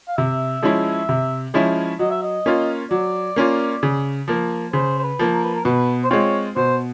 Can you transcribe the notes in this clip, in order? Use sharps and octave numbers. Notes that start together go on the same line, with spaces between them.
F5
C3 E5
F3 G#3 C#4 E4
C3
F3 G#3 C#4 E4
F#3 D#5
E5
D#5
A#3 C#4 F4
F#3 D5
A#3 C#4 F4
C#3
F3 A#3
C#3 C5
C5
B4
F3 A#3
A#4
B4
A#4
B2 B4
C5
G#3 C4 F4 C#5
B2 C5